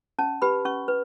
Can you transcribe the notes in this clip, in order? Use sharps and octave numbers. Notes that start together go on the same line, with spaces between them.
C#4 A5
G4 B4 B5
C#4 C#6
B4